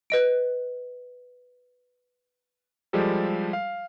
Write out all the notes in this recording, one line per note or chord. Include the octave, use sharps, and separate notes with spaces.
B4 D#5 D7
F3 G3 G#3 G4 A4
F5